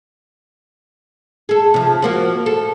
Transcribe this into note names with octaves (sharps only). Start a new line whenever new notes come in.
G#4 A4
C3 F3
F3 A#3 F#4
A4